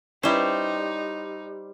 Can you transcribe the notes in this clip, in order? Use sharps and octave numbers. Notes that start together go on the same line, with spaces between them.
G3 C#4 D#4 E4 B4 C5